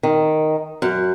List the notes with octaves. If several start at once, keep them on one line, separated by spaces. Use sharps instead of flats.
D#3
F#2